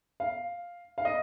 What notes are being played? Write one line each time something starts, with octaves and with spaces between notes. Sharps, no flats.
F5
F5
D#5